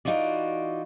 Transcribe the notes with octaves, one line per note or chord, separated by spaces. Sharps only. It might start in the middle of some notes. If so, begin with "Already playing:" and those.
E3 D#4 F4 F#4 D5